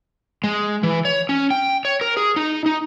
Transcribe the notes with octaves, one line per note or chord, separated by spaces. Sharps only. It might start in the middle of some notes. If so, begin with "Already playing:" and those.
G#3
E3
C#5
C#4
G5
C#5
A#4
G#4
D#4
D#4